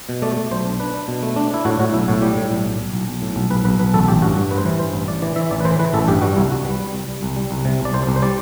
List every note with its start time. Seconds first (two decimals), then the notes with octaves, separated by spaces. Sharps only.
0.09 B2
0.22 A3 D5
0.37 A3
0.51 B1 C5
0.65 D4
0.80 D4 B4
0.94 D4
1.08 B2
1.23 A3
1.36 D4
1.51 D4 E4
1.65 A2 F#4
1.79 A2 F#4
1.94 B1 E4
2.08 A2 F#4
2.22 G3 G4
2.37 A2
2.51 B1
2.65 B1
2.79 B1
2.94 B1
3.08 B1
3.22 A2
3.36 B1
3.50 B1 B4
3.65 B1 B4
3.79 B1 B4
3.94 A1 A4
4.08 A1 G4
4.22 G2 F#4
4.36 G2 F#4
4.51 A1 B4
4.58 C5
4.65 E3 B4
4.79 G2 C5
4.93 A1
5.08 A1 D5
5.22 E3 D5
5.36 E3 E5
5.51 A1 D5
5.60 B4
5.65 E3 C5
5.79 E3 B4
5.94 A1 A4
6.08 G2 G4
6.22 G3 F#4
6.37 C2 E4
6.50 C2 F#4
6.65 G3 B4
6.80 G3
6.93 C2
7.08 C2
7.23 C2
7.36 G3
7.51 C2
7.65 C3
7.80 C2
7.85 D5
7.94 C2 C5
8.07 C2
8.16 C5
8.22 G3 D5